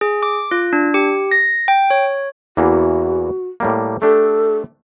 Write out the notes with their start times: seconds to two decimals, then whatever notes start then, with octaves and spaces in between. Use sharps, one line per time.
0.01 G#4
0.23 D6
0.51 F4
0.73 D4
0.94 G4
1.31 A#6
1.68 G5
1.90 C#5
2.57 E2 E3 A#3 F#4
3.60 A2 G3 A#3
4.02 A3 D4 G4 A4